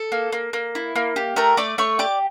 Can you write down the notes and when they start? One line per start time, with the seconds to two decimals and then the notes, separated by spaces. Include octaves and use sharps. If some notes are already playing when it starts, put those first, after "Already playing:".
Already playing: A4
0.12 A#3
0.32 A#3
0.53 A#3
0.75 E4
0.96 A#3
1.16 G4
1.36 A3 A#4 A#5
1.57 A3 D5 D6
1.78 A3 C#5 C#6
1.99 G4 D5 D6